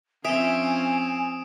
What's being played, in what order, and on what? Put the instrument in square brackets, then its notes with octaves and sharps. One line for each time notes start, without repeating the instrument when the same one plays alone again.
[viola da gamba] F3 C4 C#4 [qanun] E5 [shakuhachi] G#5 [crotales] D#6 D7 E7